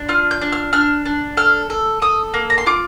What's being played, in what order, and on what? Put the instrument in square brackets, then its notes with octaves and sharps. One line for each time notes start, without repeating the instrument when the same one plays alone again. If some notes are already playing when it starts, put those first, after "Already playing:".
Already playing: [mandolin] D4
F4 F6
G6
D4
F6
D4 F6
D4
A4 F6
A4
A4 D#6
A#3
A#5
C6
F4 D6